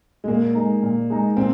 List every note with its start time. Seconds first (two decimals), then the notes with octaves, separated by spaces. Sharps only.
0.24 G#3
0.28 A#2 A#3
0.55 G#3 D#4
0.83 A#2
1.10 G#3 D#4
1.37 A#2 C4